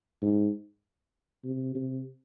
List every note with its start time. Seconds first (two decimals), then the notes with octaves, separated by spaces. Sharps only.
0.22 G#2
1.44 C3
1.74 C3